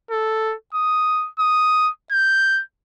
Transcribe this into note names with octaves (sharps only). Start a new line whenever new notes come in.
A4
D#6
D#6
G6